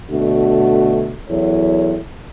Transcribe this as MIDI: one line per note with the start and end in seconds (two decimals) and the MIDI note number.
0.10 1.15 47
0.10 1.15 50
0.10 1.15 57
0.10 1.15 62
0.10 1.15 66
1.30 1.99 40
1.30 1.99 54
1.30 1.99 64
1.30 1.99 69
1.30 1.99 73